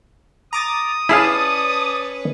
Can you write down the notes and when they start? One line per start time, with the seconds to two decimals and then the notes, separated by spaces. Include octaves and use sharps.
0.53 A#5 D6 D#6 A6
1.09 C#4 E4 G#4 B4 D5 F5 A5